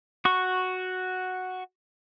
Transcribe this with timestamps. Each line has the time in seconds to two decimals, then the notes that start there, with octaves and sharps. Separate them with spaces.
0.25 F#4 C#6